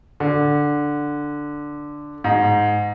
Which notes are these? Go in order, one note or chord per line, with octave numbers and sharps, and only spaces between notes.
D3
G#2